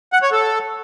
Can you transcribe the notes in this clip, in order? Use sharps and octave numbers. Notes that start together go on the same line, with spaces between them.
F#5
C#5
A4